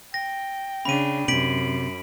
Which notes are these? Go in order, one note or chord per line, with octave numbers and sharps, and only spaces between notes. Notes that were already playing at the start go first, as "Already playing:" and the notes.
G5 A#6
C#3 D4 B5 D#7
F#2 C3 B6 D7 F#7